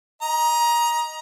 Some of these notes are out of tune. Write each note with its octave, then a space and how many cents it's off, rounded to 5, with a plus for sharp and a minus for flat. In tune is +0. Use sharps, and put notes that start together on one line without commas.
D#5 +0 A#5 +25